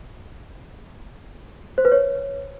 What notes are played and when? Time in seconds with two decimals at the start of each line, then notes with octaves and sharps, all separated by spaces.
1.78 C5
1.85 B4
1.92 C#5